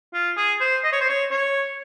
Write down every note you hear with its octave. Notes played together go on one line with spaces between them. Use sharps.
F4
G#4
C5
D#5
C#5
C5
C#5
C#5